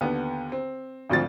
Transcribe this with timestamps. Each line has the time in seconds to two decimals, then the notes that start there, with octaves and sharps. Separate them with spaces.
0.01 D#2 D3 B3
0.52 C4
1.10 G#1 D2 F3 A6